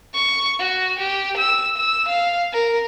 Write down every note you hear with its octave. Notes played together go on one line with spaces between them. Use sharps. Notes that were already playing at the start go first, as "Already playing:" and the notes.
C#6
F#4
G4
E6
E6
F5
A#4